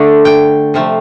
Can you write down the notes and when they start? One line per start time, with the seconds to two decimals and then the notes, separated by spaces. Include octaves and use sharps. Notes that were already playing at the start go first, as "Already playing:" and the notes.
Already playing: D3 A3 D4
0.25 G5
0.74 C3 F3 A3